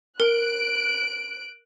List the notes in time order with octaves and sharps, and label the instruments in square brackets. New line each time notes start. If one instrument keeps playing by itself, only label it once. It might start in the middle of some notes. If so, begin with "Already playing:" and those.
[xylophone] A#4 [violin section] F#6 D7